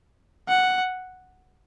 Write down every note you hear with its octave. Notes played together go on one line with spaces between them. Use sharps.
F#5